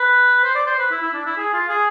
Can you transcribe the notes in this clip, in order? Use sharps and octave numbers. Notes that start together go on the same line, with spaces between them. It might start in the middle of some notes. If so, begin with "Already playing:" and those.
Already playing: B4
C5
D5
C5
B4
E4
E4
D4
E4
G#4
F4
G#4